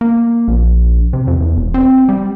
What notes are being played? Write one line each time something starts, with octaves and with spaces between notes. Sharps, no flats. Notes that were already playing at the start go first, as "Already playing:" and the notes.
A#3
A#1
C3
F2
E2
E1
C4
G3